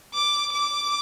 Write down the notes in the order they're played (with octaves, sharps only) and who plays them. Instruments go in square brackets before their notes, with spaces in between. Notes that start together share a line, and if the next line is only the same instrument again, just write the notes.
[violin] D6
D6